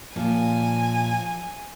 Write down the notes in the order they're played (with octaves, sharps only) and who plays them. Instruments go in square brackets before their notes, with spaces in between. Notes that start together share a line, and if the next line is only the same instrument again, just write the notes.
[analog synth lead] A#2 [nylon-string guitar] F3 [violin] G#5